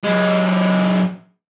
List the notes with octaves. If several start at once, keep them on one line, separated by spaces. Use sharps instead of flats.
F#2 G#3